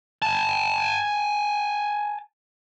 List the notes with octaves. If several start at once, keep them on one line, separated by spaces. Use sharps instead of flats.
G#5 A5